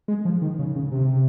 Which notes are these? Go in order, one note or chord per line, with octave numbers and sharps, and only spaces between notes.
G#3
F3
D#3
C#3
C#3
C3